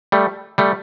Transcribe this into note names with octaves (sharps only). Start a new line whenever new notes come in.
G3 A3
G3 A3